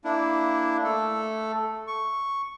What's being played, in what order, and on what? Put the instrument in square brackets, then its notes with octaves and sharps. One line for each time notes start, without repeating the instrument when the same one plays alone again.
[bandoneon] A#3 D4 E4
A3 A4
C#6